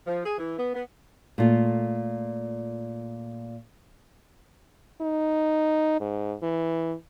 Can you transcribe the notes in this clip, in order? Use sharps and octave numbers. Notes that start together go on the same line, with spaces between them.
F3
G#4
E3
B3
B3
A#2 A3 F4
D#4
G#2
E3